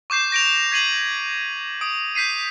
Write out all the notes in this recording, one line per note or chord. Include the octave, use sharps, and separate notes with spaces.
C#6 D6 G6 C7 E7
A#6 D7 F7
G#6 B6 C7 D#7 F7 F#7
D#6 D7
G6 B6 C7 D#7